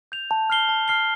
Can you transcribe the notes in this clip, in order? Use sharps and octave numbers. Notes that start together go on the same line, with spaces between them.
G6 F7
A5
F6 C7 G7
A5
F6 C7 G7